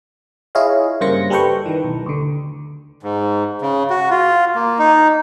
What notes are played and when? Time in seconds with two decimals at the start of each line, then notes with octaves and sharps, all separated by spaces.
0.55 E4 F4 G#4 C#5 D#5 F5
1.01 G2 C#3 A#3 C5 A#6 C#7
1.30 G3 G4 A4 B4 G5 C#6
1.66 D#3 E3
1.84 B1
2.06 D2 D3
3.03 G#2
3.62 C#3
3.90 F#4
4.11 F4
4.55 A#3
4.79 D#4